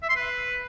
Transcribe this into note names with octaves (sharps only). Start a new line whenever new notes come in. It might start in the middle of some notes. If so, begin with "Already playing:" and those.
E5
C6
B4